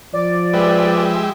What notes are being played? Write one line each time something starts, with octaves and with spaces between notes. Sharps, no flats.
F3 D5
G#3 G4 B4 E5